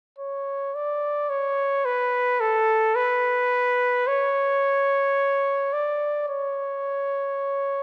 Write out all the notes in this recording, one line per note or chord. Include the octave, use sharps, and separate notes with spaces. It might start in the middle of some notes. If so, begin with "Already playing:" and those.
C#5
D5
C#5
B4
A4
B4
C#5
D5
C#5